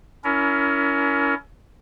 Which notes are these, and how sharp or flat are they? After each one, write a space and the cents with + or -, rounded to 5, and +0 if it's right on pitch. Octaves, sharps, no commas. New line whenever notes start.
C#4 +30 E4 +0 A#4 +0